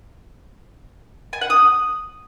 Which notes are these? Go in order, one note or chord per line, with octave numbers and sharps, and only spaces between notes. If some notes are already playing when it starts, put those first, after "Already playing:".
G#5
F#5
D#6